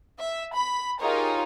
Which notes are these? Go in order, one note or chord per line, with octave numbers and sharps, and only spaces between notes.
E5
B5
D#4 F4 G4 G#4 A#4 C#5